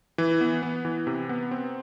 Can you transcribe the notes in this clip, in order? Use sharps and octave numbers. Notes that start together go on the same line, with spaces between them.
E3
B3
B3
E3
C3
B3
C4